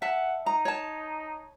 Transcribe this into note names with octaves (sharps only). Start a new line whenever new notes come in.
E5 F#5 A5
D#4 A#5
C#5 A5